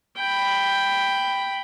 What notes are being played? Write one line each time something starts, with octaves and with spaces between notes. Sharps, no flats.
G5 B5